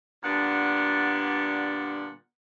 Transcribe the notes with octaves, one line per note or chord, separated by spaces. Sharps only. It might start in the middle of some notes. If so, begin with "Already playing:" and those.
A#2 D3 G3 B3 D4 F#5